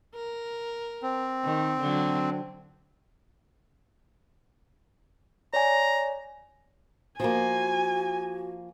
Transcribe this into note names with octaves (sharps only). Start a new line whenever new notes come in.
A#4
C4
D#3
D3 F#3
C#5 D5 G#5 A#5
F3 A#3 F#4 G#5